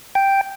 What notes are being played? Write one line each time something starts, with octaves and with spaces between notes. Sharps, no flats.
G5